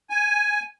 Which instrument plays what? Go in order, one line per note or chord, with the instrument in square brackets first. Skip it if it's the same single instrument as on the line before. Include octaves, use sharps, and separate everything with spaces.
[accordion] G#5